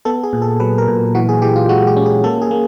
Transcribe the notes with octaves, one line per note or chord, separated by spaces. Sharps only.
B3 A4
G#4
A#2
A4
F#3 B4
A#4
A#2
E3 F#4
G#4
E3 G4
F4
G#3 F#4
G4
C#4
G#4
A#3 A4
G#4
A#3